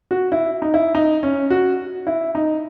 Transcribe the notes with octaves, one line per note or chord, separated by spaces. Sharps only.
F#4
E4
D#4
E4
D#4
C#4
F#4
E4
D#4